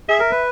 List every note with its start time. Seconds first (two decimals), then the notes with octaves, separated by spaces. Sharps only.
0.09 G#4 E5
0.20 A#4
0.31 B4